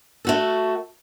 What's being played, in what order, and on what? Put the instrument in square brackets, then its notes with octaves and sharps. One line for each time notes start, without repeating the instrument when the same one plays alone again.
[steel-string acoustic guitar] A3 F#4 A4